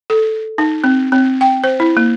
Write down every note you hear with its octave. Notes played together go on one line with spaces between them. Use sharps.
A4
D#4
C4
C4
G5
C5
E4
A#3